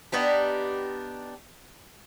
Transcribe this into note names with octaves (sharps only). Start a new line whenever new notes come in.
B3 D4 D#4 G4